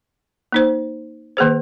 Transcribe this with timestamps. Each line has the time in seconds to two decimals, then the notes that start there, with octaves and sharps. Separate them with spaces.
0.52 A#3 D#4 C5
1.37 D#3 A#3 G#4 C5